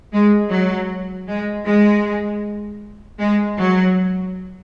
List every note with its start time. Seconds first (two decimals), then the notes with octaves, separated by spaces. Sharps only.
0.13 G#3
0.51 F#3
1.28 G#3
1.66 G#3
3.20 G#3
3.57 F#3